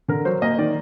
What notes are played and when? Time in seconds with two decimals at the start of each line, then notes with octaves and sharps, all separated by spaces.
0.08 D3 A#4
0.25 F#3 C5
0.42 A#3 D#5
0.58 D#3 D5